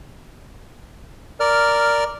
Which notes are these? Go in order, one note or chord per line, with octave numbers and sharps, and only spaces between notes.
A#4 D5 F6